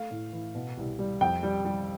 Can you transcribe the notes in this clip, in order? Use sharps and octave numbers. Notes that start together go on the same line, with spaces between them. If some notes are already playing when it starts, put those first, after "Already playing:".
Already playing: A3 F5
A2
E3
B2
C2
G3
F2 G5
G3
G3